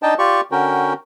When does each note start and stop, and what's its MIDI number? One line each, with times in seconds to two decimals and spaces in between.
0.03 0.14 62
0.03 0.14 63
0.03 0.14 75
0.03 0.14 79
0.03 0.14 81
0.19 0.41 65
0.19 0.41 67
0.19 0.41 74
0.19 0.41 85
0.52 0.93 50
0.52 0.93 61
0.52 0.93 66
0.52 0.93 70
0.52 0.93 79